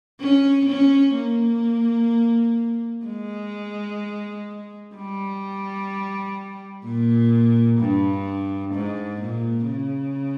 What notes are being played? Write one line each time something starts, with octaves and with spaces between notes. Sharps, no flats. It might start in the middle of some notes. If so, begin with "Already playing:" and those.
C#4
C#4
A#3
G#3
G3
A#2
G2
G#2
A#2
C#3